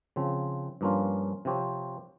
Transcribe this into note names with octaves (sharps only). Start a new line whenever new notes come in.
C#3 F3 C4
G2 F3 A#3 C#4 F4
C3 F3 C4 G4 C#5